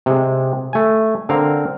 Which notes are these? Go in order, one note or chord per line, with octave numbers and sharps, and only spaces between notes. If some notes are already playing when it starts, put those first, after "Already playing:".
C3 G#3
A3 G#5
D3 C4 A#4 F5